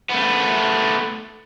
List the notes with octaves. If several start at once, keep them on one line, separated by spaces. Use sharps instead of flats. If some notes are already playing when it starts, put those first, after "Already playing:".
A3 B3